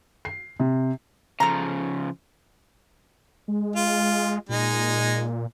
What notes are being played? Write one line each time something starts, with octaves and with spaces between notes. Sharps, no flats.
C7
C3
C#3 F3 A4 A#5
G#3
F4
A#2 G#3 D#4